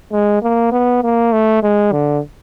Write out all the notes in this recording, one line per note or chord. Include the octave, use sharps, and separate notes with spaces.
G#3
A#3
B3
A#3
A3
G#3
D3